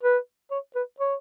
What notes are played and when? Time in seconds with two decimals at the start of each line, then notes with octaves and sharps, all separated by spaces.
0.03 B4
0.51 C#5
0.75 B4
1.00 C#5